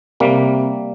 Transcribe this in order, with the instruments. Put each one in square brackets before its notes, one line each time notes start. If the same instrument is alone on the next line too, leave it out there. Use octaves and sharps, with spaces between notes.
[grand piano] C3 [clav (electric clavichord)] G3 A#3